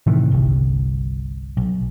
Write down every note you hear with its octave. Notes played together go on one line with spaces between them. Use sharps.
A2 C3 D#3 E3
G1 C2
B1